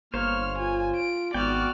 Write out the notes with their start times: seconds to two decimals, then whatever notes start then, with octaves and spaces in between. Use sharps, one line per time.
0.14 G1 A#3 C5 C#5 F5 F6
0.59 F4 G#5
0.97 D7
1.34 G#1 B3 F#4 D5 G5 F6